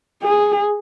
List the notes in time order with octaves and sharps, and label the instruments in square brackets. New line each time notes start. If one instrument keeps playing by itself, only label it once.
[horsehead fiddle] G#4